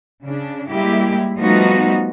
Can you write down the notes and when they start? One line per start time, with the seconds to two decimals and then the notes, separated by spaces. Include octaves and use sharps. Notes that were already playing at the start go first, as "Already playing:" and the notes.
0.23 C#3 D4
0.70 G3 G#3 A#3 E4 G4
1.37 F3 G3 A3 B3 D#4 F#4